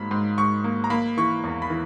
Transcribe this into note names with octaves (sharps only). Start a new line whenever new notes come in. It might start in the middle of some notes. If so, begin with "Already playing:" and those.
Already playing: G#2 F#3 A#3 B5
G#2
G#2 C#6
A#3
A#5
A#3 B5
E3 C#6
E2
B5
E3